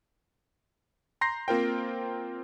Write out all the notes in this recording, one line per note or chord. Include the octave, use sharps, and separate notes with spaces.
A#5 C6 G6 A#6 C7
A#3 C4 F4 A#4 C5 G5